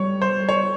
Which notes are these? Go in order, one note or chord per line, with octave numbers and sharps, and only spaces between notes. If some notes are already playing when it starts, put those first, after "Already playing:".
Already playing: G3 C#5
C5
C#5